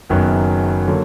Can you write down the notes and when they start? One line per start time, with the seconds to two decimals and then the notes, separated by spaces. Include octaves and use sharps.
0.09 F#1 F#2 D#3 F#3 B3
0.88 D3 F#3 A#3